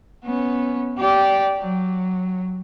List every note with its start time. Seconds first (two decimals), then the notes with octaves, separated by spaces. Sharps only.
0.24 B3 C#4
0.98 G4 D5
1.59 F#3